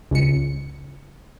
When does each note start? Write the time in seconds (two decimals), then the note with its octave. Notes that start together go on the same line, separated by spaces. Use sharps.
0.11 C#2 C#7